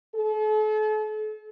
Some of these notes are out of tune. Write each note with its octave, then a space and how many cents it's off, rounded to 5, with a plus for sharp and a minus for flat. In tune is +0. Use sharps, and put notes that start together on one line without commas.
A4 -40